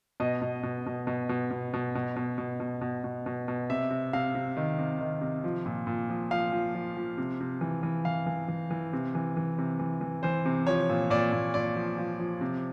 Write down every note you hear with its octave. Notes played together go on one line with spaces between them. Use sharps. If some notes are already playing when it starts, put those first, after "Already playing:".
B2 D#5
B2
B2
B2
B2
B2
B2
B2
B2
B2
B2
B2
B2
B2
B2
B2
C3 E5
C3
C3 F5
C3
D#3
C3
D#3
C3
F3
A#2
A#2
F3
F3 F5
F3
F3
F3
C3
C3
E3
E3
E3 F5
E3
E3
E3
C3
E3
E3
C3
E3
E3
E3 C5
C3
F3 C#5
A#2
A#2 D5
A#2
A#2 D5
F3
F3
F3
C3